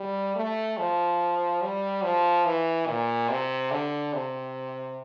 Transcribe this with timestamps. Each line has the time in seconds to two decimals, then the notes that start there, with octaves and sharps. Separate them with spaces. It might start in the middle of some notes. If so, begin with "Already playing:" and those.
Already playing: G3
0.36 A3
0.78 F3
1.62 G3
2.03 F3
2.45 E3
2.87 A#2
3.29 C3
3.71 D3
4.13 C3